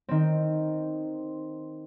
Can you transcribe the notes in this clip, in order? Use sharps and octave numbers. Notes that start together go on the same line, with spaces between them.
D#3 C4